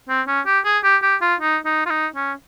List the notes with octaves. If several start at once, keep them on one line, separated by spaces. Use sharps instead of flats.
C4
C#4
G4
G#4
G4
G4
F4
D#4
D#4
F4
D#4
C#4